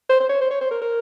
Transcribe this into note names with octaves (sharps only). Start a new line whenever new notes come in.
C5
C5
C#5
C5
C#5
C5
A#4
A#4